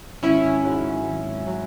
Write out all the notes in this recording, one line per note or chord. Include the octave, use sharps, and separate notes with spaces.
G#1 C#4 E4
G#2 F#3
G#1
F#3